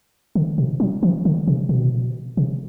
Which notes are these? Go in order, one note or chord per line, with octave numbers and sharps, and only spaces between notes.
D3
B2
F#3
E3
D3
C3
B2
C3